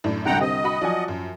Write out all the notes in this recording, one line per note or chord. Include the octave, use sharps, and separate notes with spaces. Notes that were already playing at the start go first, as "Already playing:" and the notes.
F#2 A2 D4
C2 D3 F#5 G5 A#5
C4 G4 D#5
F#4 B5
F3 F#3 D5 F#5 G#5
F#2